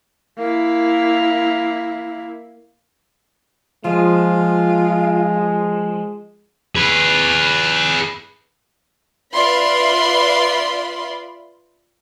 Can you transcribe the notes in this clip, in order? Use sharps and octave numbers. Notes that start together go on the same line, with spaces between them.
A#3 E4
F3 G#3 F4
G#4 B4
F4 B4 D5 E5 B5 C6